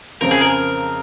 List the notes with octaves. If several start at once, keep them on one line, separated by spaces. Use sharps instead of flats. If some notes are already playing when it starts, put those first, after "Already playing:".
F2 C#3 F3 C4 A#4
G#4
A#4